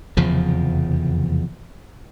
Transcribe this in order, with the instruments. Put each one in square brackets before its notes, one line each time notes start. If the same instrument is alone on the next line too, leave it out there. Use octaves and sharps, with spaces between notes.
[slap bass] F1 E2 C#3 F3